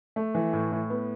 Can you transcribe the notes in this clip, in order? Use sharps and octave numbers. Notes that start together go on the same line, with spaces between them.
A3
E3
A2
A2
B3